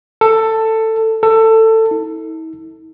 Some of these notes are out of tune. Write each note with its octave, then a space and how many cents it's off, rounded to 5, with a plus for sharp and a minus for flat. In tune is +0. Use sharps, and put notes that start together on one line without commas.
A4 +15
A4 +20
E4 -45